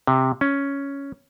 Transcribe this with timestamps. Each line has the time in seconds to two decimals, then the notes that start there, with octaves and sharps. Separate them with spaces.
0.07 C3
0.41 C#4